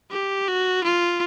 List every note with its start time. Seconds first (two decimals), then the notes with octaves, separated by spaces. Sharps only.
0.11 G4
0.48 F#4
0.83 F4